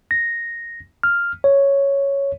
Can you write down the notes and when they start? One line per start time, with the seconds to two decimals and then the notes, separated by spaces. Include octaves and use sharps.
0.11 A#6
1.03 F6
1.44 C#5